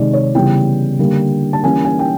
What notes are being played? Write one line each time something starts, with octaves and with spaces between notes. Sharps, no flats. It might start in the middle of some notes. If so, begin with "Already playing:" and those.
Already playing: C3 D#3 G#3 D5
C#5
C#3 E3 G3 B3 E4 G5
D3 G3 A#3 D4
A5
E3 G3 A#3 C#4 G#5
G#5
G5